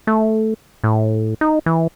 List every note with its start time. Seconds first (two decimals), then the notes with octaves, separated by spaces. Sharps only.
0.07 A3
0.84 A2
1.41 D#4
1.66 E3